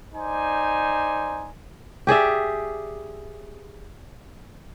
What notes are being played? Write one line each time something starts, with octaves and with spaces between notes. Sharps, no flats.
D#4 C5 D5 G#5
G4 G#4 D5 E5